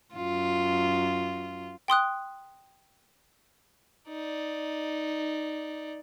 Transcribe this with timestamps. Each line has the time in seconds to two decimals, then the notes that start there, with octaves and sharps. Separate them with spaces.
0.14 F#2 F4
1.88 G5 C6 D#6 F#6
4.09 D#4 D5